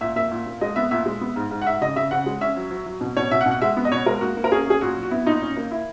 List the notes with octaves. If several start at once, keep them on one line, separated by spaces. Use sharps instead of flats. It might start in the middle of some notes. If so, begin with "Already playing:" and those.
A#2 E5
A#3 E5
A#2
A#3
G#3 D#5
B3 E5
A#2 E5
G#3
B3
G#2
G#2
F#5
G#2 E5
C#3 D#5
C#3 E5
C#3 F#5
G#3
C#4 E5
F#3
F#3
F#3
B2
B2 C#5
B2 E5
F#5
B2
F#5
G#3 E5
B3
D#5
B2 C#5
G#3 A#4
A#3 F#4
A#3
A#4
C#4 G#4
C#4 G#4
A#2 F#4
F#3
F#4
B3 E4
A#2 D#4
C#4
A#3
E4